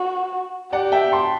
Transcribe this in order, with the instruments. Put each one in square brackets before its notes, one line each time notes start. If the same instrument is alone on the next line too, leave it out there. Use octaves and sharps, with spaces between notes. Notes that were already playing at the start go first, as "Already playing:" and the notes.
Already playing: [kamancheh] F#4
[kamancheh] G4 [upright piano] D5 F#5
[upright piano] E5 G5
A5 C6